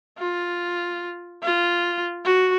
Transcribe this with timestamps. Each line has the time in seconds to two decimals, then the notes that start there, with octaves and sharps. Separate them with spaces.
0.18 F4
1.43 F4
2.25 F#4